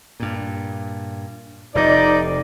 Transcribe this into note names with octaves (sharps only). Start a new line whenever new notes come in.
G2 A#2
F1 C3 D#4 D5